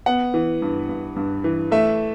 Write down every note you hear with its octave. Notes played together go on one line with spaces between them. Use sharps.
B3 F#5
E3
G2
G2
G2
E3
A3 E5